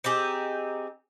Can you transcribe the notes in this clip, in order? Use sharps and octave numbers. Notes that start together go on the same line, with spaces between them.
C4 D#4 G4 G#4